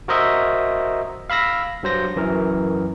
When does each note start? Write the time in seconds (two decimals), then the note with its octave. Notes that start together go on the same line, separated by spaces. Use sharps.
0.08 F#4 A#4 C5 D#5 E5 A#5
1.30 F5 B5 E6 A#6
1.83 G2 F#3 C5 A#6
2.16 F#2 E3 A#4